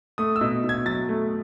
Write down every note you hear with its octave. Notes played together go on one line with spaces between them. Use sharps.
A3 D#6
E6
B2
B2
G#6
F#3 A6
A3